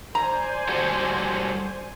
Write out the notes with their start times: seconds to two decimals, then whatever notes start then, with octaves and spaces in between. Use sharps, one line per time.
0.15 C5 D5 G#5 A#5
0.69 G3 F#4 A4